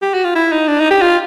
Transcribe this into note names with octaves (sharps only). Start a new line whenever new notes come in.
G4
F#4
F4
E4
D#4
D4
D#4
G4
F4